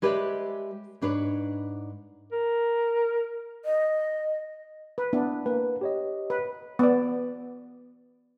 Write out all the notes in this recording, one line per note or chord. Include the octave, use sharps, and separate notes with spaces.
G#3 G4 B4 C#5 D5 E5
G#2 D4 B4 C#5
A#4
D#5
B4
B3 D4 E4
A#3 B4
G4 C#5 D#5
B4
B3 D5